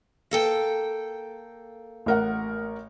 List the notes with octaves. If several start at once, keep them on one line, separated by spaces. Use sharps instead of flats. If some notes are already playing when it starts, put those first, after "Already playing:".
A#3 A4 G5
A1 A#4 F#5